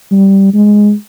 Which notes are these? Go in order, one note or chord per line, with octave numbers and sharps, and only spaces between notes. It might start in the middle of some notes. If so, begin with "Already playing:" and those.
G3
G#3